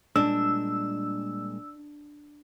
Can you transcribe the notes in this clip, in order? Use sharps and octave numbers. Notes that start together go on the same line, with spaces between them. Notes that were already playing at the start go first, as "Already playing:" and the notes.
A#2 G3 G#3 D4 E6